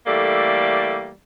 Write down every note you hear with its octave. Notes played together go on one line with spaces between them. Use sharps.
E3 G3 A3 A#3 A4 D5